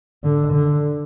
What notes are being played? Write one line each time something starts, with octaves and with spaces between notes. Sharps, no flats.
D3
D3